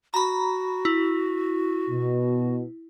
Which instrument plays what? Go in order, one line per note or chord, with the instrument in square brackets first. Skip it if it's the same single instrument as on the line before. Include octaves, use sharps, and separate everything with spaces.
[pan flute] F#4 [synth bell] A#5 B5
[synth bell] E4
[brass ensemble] B2